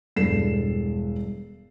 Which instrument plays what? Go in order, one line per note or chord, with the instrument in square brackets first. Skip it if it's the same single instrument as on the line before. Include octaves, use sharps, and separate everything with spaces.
[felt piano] E1 G2 A4 C7 E7